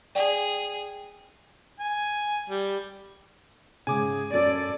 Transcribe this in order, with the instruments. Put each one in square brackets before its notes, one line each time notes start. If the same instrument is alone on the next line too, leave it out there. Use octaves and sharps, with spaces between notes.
[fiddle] G#4 [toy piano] D5 [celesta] G5
[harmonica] G#5
G3
[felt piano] G#2 C#3 [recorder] G#4 [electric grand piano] G#5 D6
[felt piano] F#2 C#4 [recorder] A4 [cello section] D5